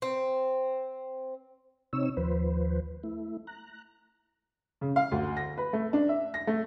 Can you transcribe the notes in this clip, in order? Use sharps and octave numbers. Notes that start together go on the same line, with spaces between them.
C4
C3 C4 D#4 C#5 E6
D#2 F3 B4 C5
A3 E4
A#5 F#6
C#3
F5
D2
A#6
B4
A3
D4
E5
A#6
A3